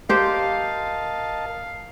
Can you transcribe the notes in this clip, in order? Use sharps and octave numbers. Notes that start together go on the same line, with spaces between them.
G4 A#4 C5 D#5 F5 A5